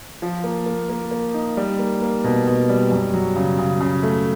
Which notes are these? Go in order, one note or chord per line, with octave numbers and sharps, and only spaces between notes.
F3
A#3
A#3
A#3
A#3
D#4
G3
A#3
A#3
B2
B2
G3
F#2
F#3
C#3
C#3
C#3
A3